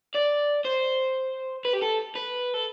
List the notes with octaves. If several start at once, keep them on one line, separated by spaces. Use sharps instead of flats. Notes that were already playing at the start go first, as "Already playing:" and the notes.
D5
C5
B4
G4
A4
B4
A4